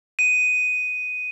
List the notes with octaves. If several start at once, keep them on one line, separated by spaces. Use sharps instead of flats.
D#7